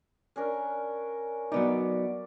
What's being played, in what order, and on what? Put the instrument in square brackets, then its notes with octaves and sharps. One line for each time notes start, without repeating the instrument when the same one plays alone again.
[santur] C#4 D4 A#4
[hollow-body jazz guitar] F#3 B3 D#4 [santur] D5